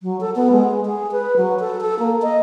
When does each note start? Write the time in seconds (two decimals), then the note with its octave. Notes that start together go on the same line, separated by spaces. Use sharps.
0.02 F#3
0.20 A4
0.36 B3
0.51 G#3
0.85 G#4
1.12 B4
1.37 F#3
1.60 A4
1.81 A4
1.99 A#3
2.22 D#5